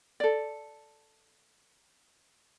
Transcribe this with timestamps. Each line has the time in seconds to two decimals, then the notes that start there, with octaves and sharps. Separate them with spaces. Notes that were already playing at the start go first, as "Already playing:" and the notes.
0.20 A4 D5